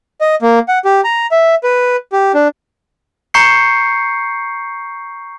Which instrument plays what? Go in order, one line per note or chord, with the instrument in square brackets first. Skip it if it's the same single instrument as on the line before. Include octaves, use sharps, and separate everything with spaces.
[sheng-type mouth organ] D#5
A#3
F#5
G4
A#5
E5
B4
G4
D4
[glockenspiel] A#5 C#6 G6 C7 C#7